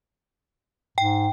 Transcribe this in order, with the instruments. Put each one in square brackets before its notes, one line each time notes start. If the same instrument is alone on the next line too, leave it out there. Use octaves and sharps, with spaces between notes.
[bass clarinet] G#2 [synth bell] G5